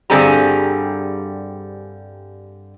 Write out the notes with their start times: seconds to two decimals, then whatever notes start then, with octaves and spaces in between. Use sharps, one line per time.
0.10 G2 D3 G3 C4 G#4 A#5